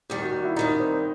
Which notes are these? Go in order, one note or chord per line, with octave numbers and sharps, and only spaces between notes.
D#2 D#3 G3 G4
F#4
F#4
E4
D#2 D#3 G3 D#4
C4